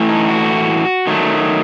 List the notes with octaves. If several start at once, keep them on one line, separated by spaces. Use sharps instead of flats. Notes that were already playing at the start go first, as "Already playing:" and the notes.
Already playing: A2 E3 A3
D#4
F#4
D#3 F#3 A3